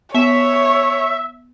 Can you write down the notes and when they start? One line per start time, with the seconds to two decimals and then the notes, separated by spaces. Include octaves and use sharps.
0.14 B3 C#5 E5